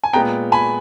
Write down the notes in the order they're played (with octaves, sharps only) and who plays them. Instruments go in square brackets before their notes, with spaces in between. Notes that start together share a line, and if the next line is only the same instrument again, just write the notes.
[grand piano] G#5
A#2 G#3 B3 G5 A#5
G#5 B5